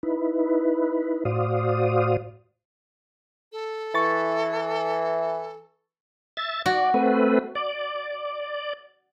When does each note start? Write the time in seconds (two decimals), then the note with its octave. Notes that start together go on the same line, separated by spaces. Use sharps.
0.03 D#4 E4 B4
1.25 A2 F#4 C5 D5 F5 D#6
3.52 A4
3.95 E3 C#6 A6
6.37 E5 A6
6.66 F#4 D5
6.94 A3 C4 B4
7.55 D5